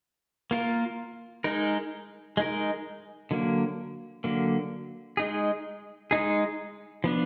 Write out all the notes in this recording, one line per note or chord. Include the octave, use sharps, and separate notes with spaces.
A#3 F4 A#4
G#3 D#4 A#4
G#3 D#4 A#4
D3 F#3 A#3
D3 F#3 A#3
G#3 D#4 G#4
G#3 D#4 G#4
F3 B3 D4